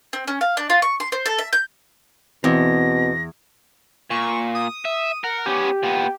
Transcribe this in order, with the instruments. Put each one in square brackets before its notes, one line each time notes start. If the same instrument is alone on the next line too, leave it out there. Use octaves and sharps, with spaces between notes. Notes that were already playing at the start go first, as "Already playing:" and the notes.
[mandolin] C4
C#4
F5
D4
F4
C#6
C6
C5
A4
E5
G6
[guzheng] E2 [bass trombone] B2 [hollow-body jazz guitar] C4 [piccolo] A#6
[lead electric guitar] A#2 [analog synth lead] C#6
[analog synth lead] D#6
[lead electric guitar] E5
[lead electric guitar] A#4 [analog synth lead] F#5
[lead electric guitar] B3 C#4 [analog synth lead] G4
[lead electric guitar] A#2 B3